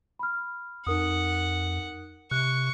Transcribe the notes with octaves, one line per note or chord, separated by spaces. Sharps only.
B5 F6
F2 D#4 A#4 F#5 D#6
C3 C#6 F#6